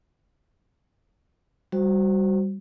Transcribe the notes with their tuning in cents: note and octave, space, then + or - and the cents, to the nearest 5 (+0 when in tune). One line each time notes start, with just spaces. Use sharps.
G3 +0 F#4 +0 C5 +0